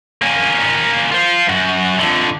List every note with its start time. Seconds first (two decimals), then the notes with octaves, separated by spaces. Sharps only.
0.22 A#3 C#4
1.12 F4 C5
1.49 F#2 F#4
1.99 F2 D3